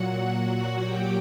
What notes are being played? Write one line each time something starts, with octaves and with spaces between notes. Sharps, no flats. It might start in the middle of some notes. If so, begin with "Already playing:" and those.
Already playing: A#2 F#3 F#4 F#5
F#4 F#5
G4 G5